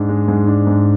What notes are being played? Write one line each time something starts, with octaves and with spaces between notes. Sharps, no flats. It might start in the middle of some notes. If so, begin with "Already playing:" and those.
Already playing: G#2 D4
G#3
G#2
D4
G#2